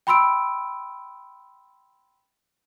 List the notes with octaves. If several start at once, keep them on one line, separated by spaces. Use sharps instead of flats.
G5 B5 C6 E6 D7